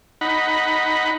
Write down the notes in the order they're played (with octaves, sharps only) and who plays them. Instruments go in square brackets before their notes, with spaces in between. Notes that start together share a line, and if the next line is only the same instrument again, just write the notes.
[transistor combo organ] D#4 F#5 B5